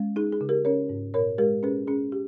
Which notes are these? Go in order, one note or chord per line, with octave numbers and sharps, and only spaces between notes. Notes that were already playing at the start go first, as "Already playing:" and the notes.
Already playing: G#3 C#4
D#4 G#4
G#4
C#3
G4 A#4
C#4 A#4 C#5
G#2
A#2 A#4 C#5
G#3 G4 A#4
C#4 G#4 B4
C#4 G#4
G4